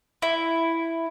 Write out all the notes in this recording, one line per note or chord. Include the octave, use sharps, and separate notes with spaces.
E4